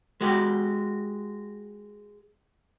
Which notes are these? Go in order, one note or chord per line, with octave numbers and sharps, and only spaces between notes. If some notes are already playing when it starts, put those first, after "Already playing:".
G#3 F#4 G4